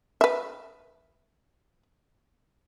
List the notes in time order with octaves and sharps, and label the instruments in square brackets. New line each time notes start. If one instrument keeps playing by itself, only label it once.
[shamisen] B4 E5